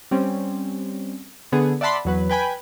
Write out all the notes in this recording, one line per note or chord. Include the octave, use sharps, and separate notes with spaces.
G3 C4 C#4
D3 B3 G#4
D5 E5 F#5 A5 B5 C6
E2 F#3 B4
B4 G5 G#5 B5